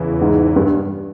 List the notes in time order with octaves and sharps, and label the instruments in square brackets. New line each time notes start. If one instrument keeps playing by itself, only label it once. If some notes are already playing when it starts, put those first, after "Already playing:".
Already playing: [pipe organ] E2 C#3 E3
[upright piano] G#2
G2